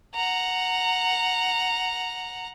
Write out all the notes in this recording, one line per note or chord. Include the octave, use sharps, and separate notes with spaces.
F#5 A#5